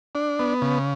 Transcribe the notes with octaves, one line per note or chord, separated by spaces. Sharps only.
D4
B3
C#3